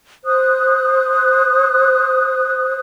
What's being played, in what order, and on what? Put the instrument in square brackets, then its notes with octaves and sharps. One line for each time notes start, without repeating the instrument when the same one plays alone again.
[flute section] C5 D#6 F#6